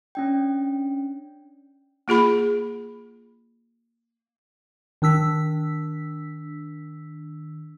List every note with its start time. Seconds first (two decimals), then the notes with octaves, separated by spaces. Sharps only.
0.15 C#4 D4 G5
2.08 A#3 F4 G#4 B5
5.02 D#3 D4 E6 B6